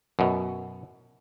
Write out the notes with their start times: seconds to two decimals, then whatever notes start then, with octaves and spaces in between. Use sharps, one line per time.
0.19 F#2 B2